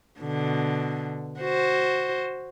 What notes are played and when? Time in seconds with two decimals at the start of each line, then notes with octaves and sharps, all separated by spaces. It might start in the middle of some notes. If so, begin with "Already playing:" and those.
0.19 B2 D3
1.41 F#4 C5